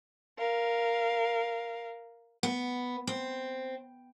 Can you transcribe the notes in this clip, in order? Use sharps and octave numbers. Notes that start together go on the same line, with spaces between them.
A#4 F5
B3
C4